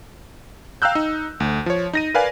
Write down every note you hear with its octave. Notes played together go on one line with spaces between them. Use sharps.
F5 G5 A#5 E6 F#6 G6
D#4
D2
F3 C#5
D#4 A#6 D#7
A#4 B4 D5 F5 G#5